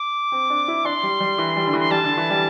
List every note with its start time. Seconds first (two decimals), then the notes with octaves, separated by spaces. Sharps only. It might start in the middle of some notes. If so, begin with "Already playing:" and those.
Already playing: D6
0.32 C4
0.50 D4
0.68 E4
0.85 D4 C6
1.03 G3
1.20 G3
1.38 E3
1.56 G3
1.66 D3
1.73 E3
1.80 C6
1.91 G3 A5
2.04 D3
2.17 E3
2.30 G3